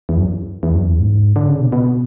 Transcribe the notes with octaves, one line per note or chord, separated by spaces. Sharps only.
E2
F#2
E2
F#2
E2
G#2
D3
C#3
B2
B2